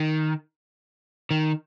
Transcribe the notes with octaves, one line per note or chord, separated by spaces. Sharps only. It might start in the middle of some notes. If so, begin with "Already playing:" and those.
Already playing: D#3
D#3